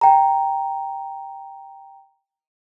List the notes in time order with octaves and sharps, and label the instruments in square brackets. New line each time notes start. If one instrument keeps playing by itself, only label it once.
[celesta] G5 A#5